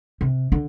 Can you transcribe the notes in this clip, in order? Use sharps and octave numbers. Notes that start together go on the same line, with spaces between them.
C3
D3